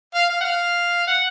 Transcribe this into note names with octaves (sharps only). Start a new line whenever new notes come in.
F5
F5
F#5
F5
F#5